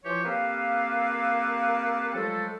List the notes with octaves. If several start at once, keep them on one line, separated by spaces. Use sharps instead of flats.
E3 F3 F4 G4 C#5
A#3 C4 G4 A4 B4 F5
F3 F#3 G#3 A3 A4